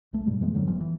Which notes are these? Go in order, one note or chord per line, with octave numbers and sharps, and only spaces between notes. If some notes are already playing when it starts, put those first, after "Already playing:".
B1 A3
G2 B2 G3 G#3
F2 E3 G#3 B3
G#2 D3 F#3 G3
F#1 F3 B3
E3